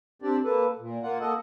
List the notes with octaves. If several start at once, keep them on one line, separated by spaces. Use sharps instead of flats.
C4 D4 G4 D5
A#3 A4 B4
A#2
A#3 F4 F#5
A#3 A4 D#5 F#5